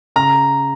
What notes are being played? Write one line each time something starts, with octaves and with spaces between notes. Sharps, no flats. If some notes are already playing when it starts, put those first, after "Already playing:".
C#3 A#5